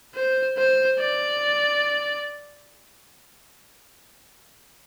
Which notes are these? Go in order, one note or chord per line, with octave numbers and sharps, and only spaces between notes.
C5
C5
D5